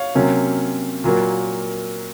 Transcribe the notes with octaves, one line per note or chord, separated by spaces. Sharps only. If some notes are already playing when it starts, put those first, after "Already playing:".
Already playing: C#5 F5
C3 F#3 A#3 C#4
A#2 F#3 A#3